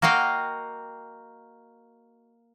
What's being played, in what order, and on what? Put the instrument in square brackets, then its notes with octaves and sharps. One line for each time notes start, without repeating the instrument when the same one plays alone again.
[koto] A#3 F#4 D#5 F5 G5